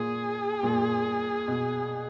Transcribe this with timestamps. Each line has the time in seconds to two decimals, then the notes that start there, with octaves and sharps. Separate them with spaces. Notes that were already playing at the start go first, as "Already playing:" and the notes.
Already playing: A#2 G#4
0.63 A#2
1.48 B2